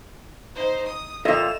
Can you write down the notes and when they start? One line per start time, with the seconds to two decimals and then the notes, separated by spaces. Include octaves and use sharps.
0.55 D#4 C5
0.87 D#6
1.25 F2 A#2 A4 D#5 E5 E7 F7